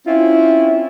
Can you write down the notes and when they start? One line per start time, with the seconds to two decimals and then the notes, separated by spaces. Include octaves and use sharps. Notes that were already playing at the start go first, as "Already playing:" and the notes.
0.07 C4 C#4 E4 F4